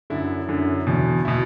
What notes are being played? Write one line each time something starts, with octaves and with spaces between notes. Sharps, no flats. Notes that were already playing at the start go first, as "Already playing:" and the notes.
F#2 D3 E4
F#2 D3
E2 B2
B2 E4